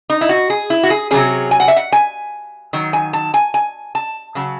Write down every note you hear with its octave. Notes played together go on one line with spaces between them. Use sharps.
D#4
E4
F#4
G#4
E4
F#4
G#4
C3 F#3 A3 C#4 G#4
G#5
F#5
E5
F#5
G#5
D#3 F#3
G#5
A5
G#5
G#5
A5
C#3 F#3